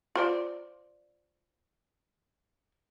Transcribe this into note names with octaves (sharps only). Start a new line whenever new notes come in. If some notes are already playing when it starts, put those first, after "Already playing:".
F4 C5 D5